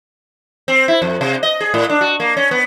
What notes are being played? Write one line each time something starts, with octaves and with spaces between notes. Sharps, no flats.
C4
E4
F2
C3
D#5
G#4
A2
D4
F#4
A#3
C#4
B3